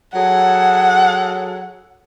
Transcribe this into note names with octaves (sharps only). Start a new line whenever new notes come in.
F#3 G#4 A4 F#5